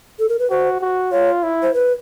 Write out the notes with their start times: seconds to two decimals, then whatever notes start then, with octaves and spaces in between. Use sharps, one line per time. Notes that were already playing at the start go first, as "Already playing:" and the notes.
0.19 A4
0.29 A#4
0.39 B4
0.50 F#4 C5
0.81 F#4
1.12 F4 C#5
1.43 E4
1.62 C5
1.74 B4